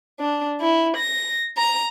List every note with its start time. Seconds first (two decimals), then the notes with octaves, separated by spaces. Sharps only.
0.20 D4
0.61 E4
0.97 A#6
1.58 A#5